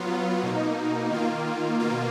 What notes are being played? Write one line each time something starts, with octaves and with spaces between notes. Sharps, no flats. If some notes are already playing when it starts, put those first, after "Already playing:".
Already playing: F#3 B3 F4
B2 A#3 D#4
D#3 A#3 F4
B2 A#3 F4